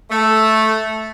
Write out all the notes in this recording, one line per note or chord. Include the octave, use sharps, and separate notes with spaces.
A3